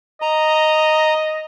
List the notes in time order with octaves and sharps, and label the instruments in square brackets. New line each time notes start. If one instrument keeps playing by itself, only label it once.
[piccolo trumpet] D#5 [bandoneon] A#5